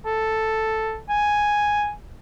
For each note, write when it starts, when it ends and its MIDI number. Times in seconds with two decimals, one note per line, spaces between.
0.06 0.98 69
1.09 1.91 80